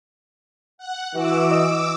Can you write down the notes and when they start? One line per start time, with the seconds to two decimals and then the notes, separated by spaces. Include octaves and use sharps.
0.78 F#5
1.15 E3 F#4 D6 E6
1.51 D#5